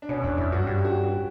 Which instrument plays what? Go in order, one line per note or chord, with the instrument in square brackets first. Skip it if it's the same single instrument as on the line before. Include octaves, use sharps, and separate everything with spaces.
[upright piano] D4
[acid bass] B2 [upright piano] C#4
[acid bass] E2 [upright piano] D4
[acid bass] F#2 [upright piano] E4
[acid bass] G2 [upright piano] F#4
[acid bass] G2 [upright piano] G4
[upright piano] G4
F#4
F#4